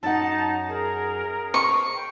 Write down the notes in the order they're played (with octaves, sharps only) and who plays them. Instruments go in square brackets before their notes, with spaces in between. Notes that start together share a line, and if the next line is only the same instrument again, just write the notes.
[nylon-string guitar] F#2 F#5 [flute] D#4 [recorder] A5
[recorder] G#4 [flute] A#4
[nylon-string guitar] C5 [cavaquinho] C#6
[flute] G5